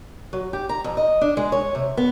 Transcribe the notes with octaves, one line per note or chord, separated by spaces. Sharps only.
F#3
G4
A#5
F2
D#5
D4
G#3
C#5
C3
B3